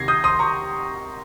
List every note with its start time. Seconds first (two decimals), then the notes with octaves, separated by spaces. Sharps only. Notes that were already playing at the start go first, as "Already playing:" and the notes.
Already playing: C3 D#3 G#6 A#6 C7
0.08 D#6 G6
0.24 C6 D#6
0.39 A#5 C#6